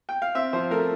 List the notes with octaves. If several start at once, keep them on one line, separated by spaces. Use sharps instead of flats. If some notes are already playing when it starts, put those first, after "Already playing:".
G5
F5
C4 E5
F3 C5
A3 A#4